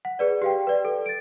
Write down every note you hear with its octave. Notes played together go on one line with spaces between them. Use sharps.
F#5
G#4 B4 D5
G4 F5 G5
B4 D5
A4
A6 D7